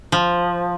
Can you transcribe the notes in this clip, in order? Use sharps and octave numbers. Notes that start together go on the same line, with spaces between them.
F3